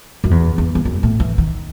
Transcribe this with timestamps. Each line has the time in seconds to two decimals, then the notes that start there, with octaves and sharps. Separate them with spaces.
0.24 F#2
0.31 E2
0.58 E2
0.75 E2
0.85 F#2
1.03 A2
1.20 E3
1.38 D#3